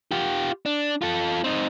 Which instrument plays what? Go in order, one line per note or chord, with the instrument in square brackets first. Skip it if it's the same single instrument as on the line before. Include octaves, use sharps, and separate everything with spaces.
[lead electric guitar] F4 G4
D4
F4 A4
C4 D#4